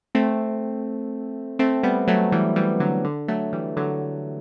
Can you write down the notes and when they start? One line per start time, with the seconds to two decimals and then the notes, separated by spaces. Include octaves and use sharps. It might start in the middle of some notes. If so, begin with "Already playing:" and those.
0.15 A3 C4
1.59 A3 C4
1.83 G3 B3
2.08 F#3 A3
2.32 E3 G3
2.56 E3 G3
2.80 D3 F#3
3.05 D3
3.28 F#3 A3
3.53 E3 G3
3.77 D3 F#3